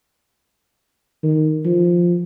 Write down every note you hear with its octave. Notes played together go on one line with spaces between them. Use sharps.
D#3
F3